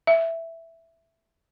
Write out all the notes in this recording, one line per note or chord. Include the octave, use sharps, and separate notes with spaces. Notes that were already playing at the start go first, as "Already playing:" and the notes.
E5